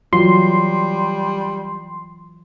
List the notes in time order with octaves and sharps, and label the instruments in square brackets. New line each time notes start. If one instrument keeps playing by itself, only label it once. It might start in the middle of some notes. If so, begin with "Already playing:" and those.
[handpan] E3 F#3 F4 [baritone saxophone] G3 [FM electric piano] C6